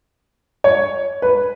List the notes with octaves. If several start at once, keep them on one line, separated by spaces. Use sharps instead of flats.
C#5
B4